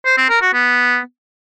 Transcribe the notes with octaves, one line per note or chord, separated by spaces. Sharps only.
C5
C4
A#4
F#4
B3